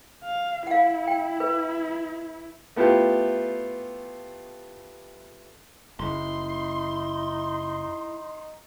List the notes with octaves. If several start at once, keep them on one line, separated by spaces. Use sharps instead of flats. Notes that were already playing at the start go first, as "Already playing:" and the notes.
F5
E4 F5 F#5
G5
B4
A3 B3 E4 F4 G4
F#1 D#4 E4 C6